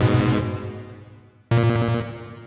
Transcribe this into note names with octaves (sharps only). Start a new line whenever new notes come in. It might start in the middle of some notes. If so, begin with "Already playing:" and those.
Already playing: G#2 B2
A#2